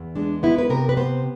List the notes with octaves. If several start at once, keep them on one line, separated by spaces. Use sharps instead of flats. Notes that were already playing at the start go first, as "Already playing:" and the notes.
Already playing: E2
G#3 D4
B3 E4
B4
C3 A#4
B4
B3 C5